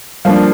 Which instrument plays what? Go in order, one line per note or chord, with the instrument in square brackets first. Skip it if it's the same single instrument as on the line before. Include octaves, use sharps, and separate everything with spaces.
[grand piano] F3 A#3 D4 [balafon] G3